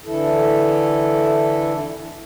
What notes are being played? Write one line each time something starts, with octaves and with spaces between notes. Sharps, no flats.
D3 E3 E4 A4